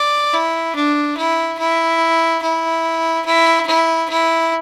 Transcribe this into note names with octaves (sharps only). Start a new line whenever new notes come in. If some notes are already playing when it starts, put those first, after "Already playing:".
Already playing: D5
E4
D4
E4
E4
E4
E4
E4
E4